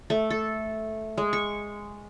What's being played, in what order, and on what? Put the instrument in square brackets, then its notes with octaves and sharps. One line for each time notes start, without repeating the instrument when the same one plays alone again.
[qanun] A3
A4
G#3
C#6